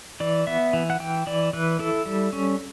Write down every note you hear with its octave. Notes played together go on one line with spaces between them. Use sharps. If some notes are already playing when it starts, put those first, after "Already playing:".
E3 D5
B3 E5
E3
F#5
E3 G5
E3 D5
E3 B4
E4 A4
G3
C#4